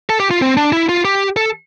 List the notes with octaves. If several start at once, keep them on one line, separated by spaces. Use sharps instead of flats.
A4
G4
F4
C4
D4
E4
F4
G4
A4